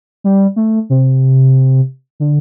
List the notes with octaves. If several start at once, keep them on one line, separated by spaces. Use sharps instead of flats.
G3
A3
C3
D3